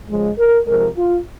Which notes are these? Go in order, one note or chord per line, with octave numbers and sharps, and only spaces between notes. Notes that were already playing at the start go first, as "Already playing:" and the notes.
C#3 F3 G#3
A#4
C3 F3 G#3 A#4
F4